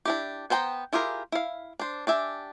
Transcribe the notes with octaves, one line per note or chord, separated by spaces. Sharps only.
D4 E4 G4
B3 C5 G5 A5 A#5
E4 F4 G4 G#4 A#4
E4 F5
D4 C5
D4 G4 E5 G#5